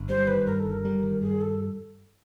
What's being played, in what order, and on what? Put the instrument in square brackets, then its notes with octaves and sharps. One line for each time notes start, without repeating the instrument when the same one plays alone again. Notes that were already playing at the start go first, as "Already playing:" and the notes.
Already playing: [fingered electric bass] G1
[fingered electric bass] G3 [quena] C5
[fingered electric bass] D#3 [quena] B4
[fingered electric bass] G2 [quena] A#4
[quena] A4
[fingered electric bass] G1
[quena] A#4
[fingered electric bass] G3
D#3
[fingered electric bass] G2 [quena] G#4
[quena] A4